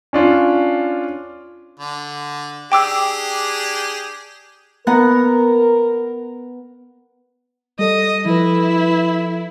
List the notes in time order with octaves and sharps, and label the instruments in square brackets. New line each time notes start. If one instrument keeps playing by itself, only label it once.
[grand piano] C#4 D4 F4
[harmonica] D3
[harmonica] D4 G4 G#4 [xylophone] G5 D6 E6
[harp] B3 F#5 A#5 [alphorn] A#4
[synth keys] G3 A4 [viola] D#5
[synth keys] F3 A4 B4 [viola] E4